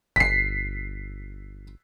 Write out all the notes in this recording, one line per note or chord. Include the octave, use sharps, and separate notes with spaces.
G1 B6 C7